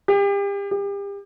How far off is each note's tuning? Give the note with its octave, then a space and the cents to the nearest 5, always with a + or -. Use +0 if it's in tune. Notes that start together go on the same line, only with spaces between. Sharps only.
G4 +35
G4 +35